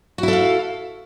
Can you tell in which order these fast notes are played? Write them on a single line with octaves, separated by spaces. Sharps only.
F#4 E4 A4 F5